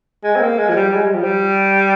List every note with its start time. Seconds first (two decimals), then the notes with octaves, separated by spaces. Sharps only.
0.24 G#3
0.36 C4
0.41 A#3
0.59 G#3
0.69 F3
0.77 G3
0.94 G#3
1.05 G3
1.15 F3
1.24 G3